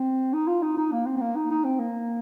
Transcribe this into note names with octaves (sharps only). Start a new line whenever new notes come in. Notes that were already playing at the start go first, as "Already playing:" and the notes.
Already playing: C4
D#4
F4
D#4
D#4
A#3
C4
C4
A#3
D#4
D#4
C4
A#3